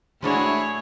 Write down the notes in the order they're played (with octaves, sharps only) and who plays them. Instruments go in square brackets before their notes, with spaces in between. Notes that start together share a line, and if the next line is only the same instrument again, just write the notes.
[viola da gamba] A2 C#5 [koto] G#3 D4 F#4 [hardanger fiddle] E4 G#4